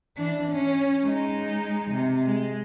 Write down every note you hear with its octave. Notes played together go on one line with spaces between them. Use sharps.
E3 D4
C#4
G#3 D#4
C3
G#3